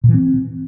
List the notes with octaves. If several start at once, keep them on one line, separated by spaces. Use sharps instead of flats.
A#2
E3
C4